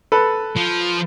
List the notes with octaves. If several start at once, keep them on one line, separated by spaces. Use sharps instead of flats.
A4 B4
F3